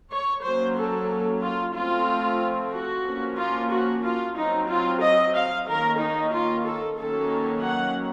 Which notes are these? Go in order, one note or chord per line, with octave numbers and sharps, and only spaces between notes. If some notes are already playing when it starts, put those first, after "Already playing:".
C#5
F#3 A#3 C#4 C5
A4
F4
F3 A3 C4 F4
F#4
F3 A#3 C#4
F4
F#4
F4
F#3 C4 D#4
F4
D#5
F5
D#3 A#3 C#4 A#4
D#4
F4
A4
D#3 F#3 A#3 C#4 A4
F#5